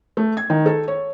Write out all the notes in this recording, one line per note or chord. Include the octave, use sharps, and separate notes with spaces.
A3
G#6
D#3
A4
C#5